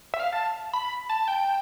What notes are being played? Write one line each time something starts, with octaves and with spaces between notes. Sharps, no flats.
E5
F5
A5
B5
A5
G5